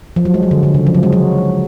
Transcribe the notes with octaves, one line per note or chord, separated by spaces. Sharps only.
F3
F#3
G#3
F#3
D3
D3
C#3
F3
F#3
G#3
F#3